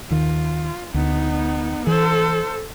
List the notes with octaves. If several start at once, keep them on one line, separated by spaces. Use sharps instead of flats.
D#2 D#3 F4
D2 B3 D#4
E3 A4 C5